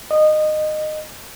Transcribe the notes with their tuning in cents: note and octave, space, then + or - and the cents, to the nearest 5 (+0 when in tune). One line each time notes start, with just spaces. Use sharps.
D#5 -20